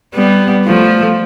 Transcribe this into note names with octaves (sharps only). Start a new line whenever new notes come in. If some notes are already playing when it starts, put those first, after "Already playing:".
G3 B3
F3 A3